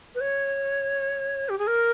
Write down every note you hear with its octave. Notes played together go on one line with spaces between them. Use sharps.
B4
C#5
G4
G#4
A#4